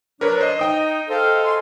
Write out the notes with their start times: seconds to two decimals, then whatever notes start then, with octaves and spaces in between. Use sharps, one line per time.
0.21 F#3 D4 A#4 B4 C#5
0.41 C5 D#5
0.59 D#4 D#5 G5 D#6
1.09 A4 C5 F5
1.43 F5 G#5 C6